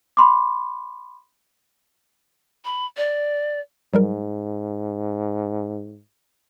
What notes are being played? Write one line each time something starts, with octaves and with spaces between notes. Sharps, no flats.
B5 C6 D6
B5
D5
G#2 F#3 G3 A#4